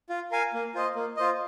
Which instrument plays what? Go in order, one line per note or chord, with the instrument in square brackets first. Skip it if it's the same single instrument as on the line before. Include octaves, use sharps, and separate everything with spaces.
[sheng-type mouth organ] F4
A#4 F5 G#5
A#3
F4 C5 D#5
A#3
F4 C5 D#5